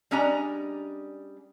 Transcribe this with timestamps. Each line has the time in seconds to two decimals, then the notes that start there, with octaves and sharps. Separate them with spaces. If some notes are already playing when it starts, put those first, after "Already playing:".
0.11 G3 G#3 C#4 D4 G#5 A#5